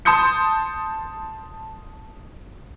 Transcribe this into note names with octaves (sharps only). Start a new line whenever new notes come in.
A5 C6 D#6 G6 C#7